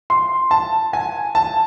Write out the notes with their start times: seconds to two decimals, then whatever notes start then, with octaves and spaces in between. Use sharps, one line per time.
0.10 C6
0.51 A5
0.93 G#5
1.35 A5